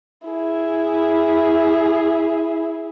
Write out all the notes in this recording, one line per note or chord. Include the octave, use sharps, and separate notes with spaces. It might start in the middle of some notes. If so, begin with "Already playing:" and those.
E4 G#4